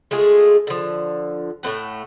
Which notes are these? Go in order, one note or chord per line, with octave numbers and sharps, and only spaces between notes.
G#3 A3 F4 G#4
D3 F3
A2 A3 C4 F#5